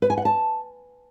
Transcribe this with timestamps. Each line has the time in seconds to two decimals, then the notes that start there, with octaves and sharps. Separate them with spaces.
0.02 B4
0.10 G#5
0.18 F#5
0.25 A5